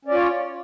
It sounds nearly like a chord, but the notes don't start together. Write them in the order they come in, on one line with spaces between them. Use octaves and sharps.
C#4 D5 F4 C#5